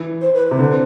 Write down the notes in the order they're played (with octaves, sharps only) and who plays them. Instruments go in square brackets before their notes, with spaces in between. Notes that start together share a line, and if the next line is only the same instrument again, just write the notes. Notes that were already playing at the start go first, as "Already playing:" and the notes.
Already playing: [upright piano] E3
[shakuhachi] C5
B4
[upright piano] C3 [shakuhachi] C5
[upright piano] D3